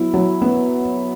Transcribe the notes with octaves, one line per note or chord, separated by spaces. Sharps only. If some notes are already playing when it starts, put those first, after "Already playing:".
Already playing: F#3 B3 E4
F#3
B3